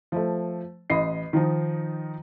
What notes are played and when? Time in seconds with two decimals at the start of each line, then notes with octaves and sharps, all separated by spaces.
0.12 F3 A3
0.90 A1 D#5 B5 C7
1.33 D#3 F3 D#4